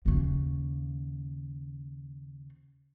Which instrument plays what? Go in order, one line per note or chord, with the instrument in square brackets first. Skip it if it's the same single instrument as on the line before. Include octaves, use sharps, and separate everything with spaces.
[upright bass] D#2 C#3